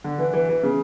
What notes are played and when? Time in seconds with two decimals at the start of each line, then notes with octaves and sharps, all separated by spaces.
0.04 D3
0.19 E3
0.34 E3
0.49 E3
0.63 C#3